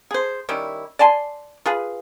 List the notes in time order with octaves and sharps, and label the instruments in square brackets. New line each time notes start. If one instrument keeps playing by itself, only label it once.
[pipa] G#4 C5
D#3 G3 C#4 E4
D5 G#5 A5 C6
F4 G#4 B4